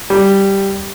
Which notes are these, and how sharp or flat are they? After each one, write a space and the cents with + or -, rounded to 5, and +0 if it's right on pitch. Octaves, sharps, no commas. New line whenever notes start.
G3 +0